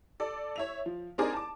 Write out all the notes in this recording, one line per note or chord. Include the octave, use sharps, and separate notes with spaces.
A4 D5
C#5 E5 F7
F3
C4 D4 D#4 G#4 A#4 D5
A5 D6